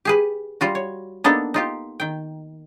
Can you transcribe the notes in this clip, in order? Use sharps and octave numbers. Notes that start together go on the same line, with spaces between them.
G4 G#4 B4
G3 F4 F#4
C#5
A#3 B3 D4 D#4 A4
D#4 F4 G4
D#3 G5